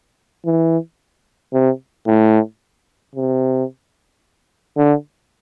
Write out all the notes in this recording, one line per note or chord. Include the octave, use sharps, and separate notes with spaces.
E3
C3
A2
C3
D3